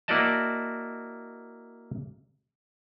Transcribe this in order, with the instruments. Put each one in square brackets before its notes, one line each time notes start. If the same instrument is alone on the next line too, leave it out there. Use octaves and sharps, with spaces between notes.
[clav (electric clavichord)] A#3 E4 F#4 D5 D#5 A5